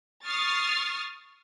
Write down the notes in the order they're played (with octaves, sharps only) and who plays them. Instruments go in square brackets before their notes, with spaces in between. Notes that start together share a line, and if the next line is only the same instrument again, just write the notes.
[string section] C#6 D#6 F6 A6 C7